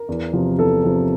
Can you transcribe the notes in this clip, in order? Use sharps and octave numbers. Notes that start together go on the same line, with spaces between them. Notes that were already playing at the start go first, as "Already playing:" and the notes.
Already playing: A#4
E2
C3 F3
E2 A4
C3 F3